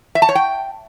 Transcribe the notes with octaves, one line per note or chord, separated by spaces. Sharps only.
E5
A5
C#5
G5